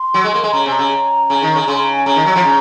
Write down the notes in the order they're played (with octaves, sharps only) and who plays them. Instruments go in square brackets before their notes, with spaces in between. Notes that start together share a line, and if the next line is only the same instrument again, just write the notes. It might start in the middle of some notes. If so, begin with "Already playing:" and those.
Already playing: [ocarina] C6
[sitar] F#3
G#3
A#3
G#3
[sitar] C#3 [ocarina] A#5
[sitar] C3 [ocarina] G#5
[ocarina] A#5
[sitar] C#3
C#3
D#3
C#3
[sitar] C#3 [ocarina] C6
[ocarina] A#5
G#5
[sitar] C#3 [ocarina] A#5
[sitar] D#3
F#3
F3
C#3